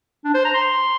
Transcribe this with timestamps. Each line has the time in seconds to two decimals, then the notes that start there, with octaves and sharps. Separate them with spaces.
0.25 D4
0.34 C5
0.45 A#5
0.54 C6